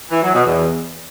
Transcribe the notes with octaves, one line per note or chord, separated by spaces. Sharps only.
E3
F#3
B2
E2